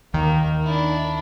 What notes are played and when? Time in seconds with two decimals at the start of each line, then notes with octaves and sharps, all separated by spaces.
0.14 D#2 D#3 A#3
0.64 D4 E4